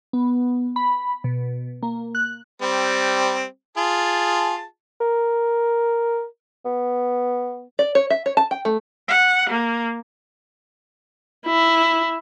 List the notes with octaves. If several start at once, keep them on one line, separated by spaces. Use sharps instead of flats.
B3
B5
B2
A#3
F#6
G3 C4
F4 G#4 A5
A#4
B3
D5
C#5
E5
C#5
A5
G5
A3
F#5
A#3
E4